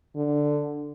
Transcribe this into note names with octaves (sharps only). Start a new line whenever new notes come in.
D3